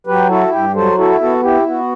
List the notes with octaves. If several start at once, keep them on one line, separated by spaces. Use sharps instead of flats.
F#3 G4 B4
E4 F#4 A4
G2 G4
F#3 A4 C5
E4 F#4 A4
B3 F#4 A4
E4 G4
B3 F#4